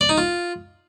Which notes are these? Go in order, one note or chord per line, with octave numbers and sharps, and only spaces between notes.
D5
D#4
F4